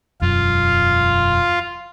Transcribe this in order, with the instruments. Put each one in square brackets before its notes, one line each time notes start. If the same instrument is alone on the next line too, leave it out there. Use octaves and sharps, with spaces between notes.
[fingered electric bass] E1 F#2 [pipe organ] F4